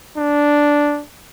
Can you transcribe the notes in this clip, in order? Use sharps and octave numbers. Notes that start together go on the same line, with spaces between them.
D4